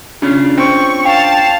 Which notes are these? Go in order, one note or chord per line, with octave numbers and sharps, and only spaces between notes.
C#3 C#4 D4 F4
C4 C#6
F5 G5 A5